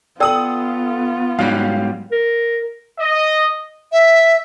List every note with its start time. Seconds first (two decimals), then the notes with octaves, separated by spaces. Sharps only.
0.20 B3 F4 A4 D5 G5 D#6 E6 F#7
1.39 G#2 F#3 G3 F5
2.12 A#4
3.00 D#5
3.92 E5